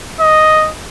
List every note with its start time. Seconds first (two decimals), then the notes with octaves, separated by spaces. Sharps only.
0.20 D#5